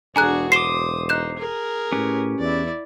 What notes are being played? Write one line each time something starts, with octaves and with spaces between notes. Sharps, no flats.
E1 D4 F#4 G#4 G#5 A#5 F#6
C5 D6 D#6 C7 E7 G7
D#4 F#6 G6 E7
G#4 A#4
A2 C#4 G4 B4
E2 E4 D5